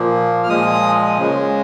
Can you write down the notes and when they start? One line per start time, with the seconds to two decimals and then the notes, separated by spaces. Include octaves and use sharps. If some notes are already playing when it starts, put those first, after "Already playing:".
Already playing: A#2 F3 A#3
0.43 F6
0.49 A#2 F3 G#3 D#6
1.18 C#3 G#3